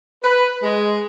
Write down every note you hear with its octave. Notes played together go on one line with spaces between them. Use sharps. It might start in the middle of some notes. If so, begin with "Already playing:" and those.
B4
G#3